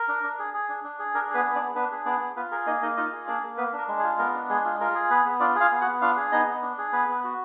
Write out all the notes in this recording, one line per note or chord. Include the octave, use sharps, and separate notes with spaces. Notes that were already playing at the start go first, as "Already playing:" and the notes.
Already playing: A#4
D4
D4
G#4
G#4
D4
D4
G#4
D4 A#4
B3 G#4 B4
B3
D4 D5
B3
B3 D4 B4
G#4
B3 D4 D5
B3
B3 F4 B4
G#4 A#4
A#3 D#4 D#5
A#3 D#4 D#5
D#4 F4 D#5
G#4
A#3 D4 D5
A#3
B3 B4
D4 A#4
G#3
G#4
F4
B3 A#4
D4
G#3 G#4
F4
F4 A#4
G#4
B3 B4
B3
D4 F4 D5
G#4
F4 F5
B3
F#4 F#5
B3
D4 F4 F5
G#4
B3 D#4 D#5
B3
D4
G#4
B3 B4
B3
F#4